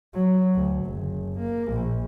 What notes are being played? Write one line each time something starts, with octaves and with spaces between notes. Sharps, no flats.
F#3
D2
F#1
A#3
A#1